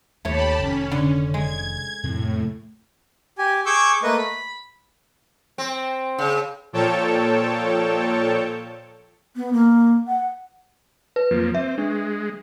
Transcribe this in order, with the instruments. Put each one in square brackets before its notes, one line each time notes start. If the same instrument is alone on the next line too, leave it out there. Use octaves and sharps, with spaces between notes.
[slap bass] D#2 D#3 [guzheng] A3 C#5 [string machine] G4 A5 B5
[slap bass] F1 D#3 [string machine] C#4
[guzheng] D3
[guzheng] G#3 [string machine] G#6
[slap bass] F2 C3 C4 [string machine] A2
[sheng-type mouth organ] G4 G#5
G#4 C#6 D6 E6 G6
A3 A#3 B4 D#5
B5
[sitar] C4
C#3
[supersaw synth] A#2 F3 A4 C#5 G5 A5
[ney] B3
A#3
F#5
[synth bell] B4
[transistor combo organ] F2 F3 A#3
[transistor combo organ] C4 [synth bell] E5
[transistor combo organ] G#3 [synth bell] D4